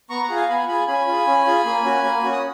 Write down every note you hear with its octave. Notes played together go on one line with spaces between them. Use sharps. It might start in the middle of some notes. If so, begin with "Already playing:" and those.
B3 A#5 C#6
F#5 A#5
F4 G#4
F5 G#5
B3 G#5 B5
F4 G#4 G#5 B5
C#4 G#5 B5
F4 G#4
C#4
F4 G#4
A#3
C#4 F#4
A#3
C#4 F#4
D#6